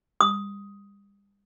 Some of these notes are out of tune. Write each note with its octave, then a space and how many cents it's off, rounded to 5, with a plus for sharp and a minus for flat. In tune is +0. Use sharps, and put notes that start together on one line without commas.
D#6 +10